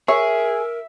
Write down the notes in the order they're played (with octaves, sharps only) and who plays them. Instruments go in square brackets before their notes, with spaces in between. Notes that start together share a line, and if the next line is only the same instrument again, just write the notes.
[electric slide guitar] G#4 [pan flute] A#4 [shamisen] C#5 [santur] E5